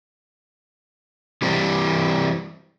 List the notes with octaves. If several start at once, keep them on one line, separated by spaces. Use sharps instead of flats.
E3 G3 C4